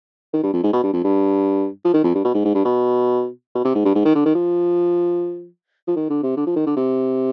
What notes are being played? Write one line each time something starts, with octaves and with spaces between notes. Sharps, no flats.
D#3
G2
F2
G#2
B2
G2
F2
G2
F3
D#3
F2
G2
B2
G#2
G#2
G2
B2
B2
C3
G#2
G2
G#2
D#3
D3
D#3
F3
F3
D#3
D3
C3
D3
F3
D#3
D3
C3